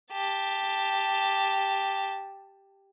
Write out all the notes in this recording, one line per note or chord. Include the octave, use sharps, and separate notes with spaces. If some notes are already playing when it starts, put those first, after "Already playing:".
G4 A5